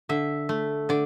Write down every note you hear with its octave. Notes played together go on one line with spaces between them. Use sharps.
D3 E5
A3
D3 D5